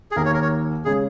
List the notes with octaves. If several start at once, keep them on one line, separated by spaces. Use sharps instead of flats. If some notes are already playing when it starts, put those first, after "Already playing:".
G#4
D#2 D#3 A#3 A#4
C#5
A#4
C#5
C#3 G#3 C#4 G#4